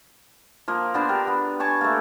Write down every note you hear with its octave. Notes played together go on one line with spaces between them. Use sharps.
F3 A#3
B3 D4 C5
G4 A#4 B4
B3
G#5 A5 C#6 D6
A3 A#3